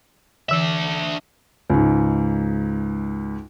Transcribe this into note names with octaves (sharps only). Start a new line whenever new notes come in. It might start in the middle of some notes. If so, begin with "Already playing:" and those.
D3 E3 D4 E5
C#2 G#2